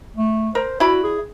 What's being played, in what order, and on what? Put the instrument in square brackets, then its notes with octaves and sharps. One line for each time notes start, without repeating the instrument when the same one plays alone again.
[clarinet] A3
[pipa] A#4 [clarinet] C5
[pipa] E4 D5 B5 [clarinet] F#4
[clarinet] G#4